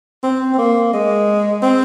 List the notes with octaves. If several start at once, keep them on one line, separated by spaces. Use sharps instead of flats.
C4
C4
A#3
G#3
C4